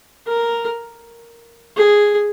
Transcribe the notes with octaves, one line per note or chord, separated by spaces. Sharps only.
A#4
G#4